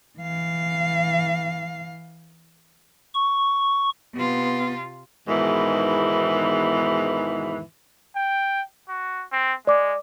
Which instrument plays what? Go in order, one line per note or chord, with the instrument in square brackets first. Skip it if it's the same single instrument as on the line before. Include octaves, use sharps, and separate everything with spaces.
[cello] E3 F5
[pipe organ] C#6
[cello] C3 F4 [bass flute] B3
[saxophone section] E2 G#2 B2 D#3 E3
[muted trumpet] G5
F#4
C4
[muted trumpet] G#3 [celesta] D5 D6